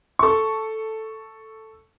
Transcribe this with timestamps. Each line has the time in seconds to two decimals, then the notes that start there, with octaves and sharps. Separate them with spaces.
0.19 A4 C#6